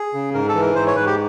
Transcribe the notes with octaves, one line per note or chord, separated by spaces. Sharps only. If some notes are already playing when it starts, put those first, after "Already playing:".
Already playing: G#4
C#3
G#2 A#4
A4
E3
A#4
G#2 C5
C#5
G#2 B4
G4